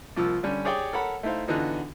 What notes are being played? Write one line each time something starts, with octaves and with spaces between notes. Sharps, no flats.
C2 F3 A#3 E6
D3 G3 C#4
G4 G#4 C#5 D5 G5
A4 A#4 C#5 F#5 B5
A3 D#4 E4 C5 F5
D3 E3 B3 D#4 F4 F#4